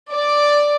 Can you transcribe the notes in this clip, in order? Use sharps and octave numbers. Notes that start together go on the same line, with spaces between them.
D5